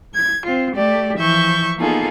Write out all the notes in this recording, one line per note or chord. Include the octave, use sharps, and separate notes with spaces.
G#6
C4 F4
A3 G4 D5
E3 F3 E5 C#6 G6
A#3 B3 D#4 F4 G#4 A4